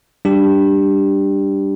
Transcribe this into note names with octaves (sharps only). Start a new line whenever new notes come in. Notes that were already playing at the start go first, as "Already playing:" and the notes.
G3 D4 G4